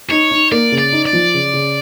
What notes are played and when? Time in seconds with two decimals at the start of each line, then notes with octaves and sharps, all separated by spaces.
0.11 D#4 C#5
0.31 D#4
0.52 A#3 D5
0.72 C#3
0.78 D5
0.92 D#4
1.06 D5
1.13 F3
1.34 C#3
1.53 C#3